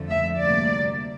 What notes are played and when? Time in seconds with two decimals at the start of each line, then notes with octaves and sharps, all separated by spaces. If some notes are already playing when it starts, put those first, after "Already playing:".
Already playing: F2 D3 F3 A3
0.10 E5
0.39 D2 C3 G3 A#3 D5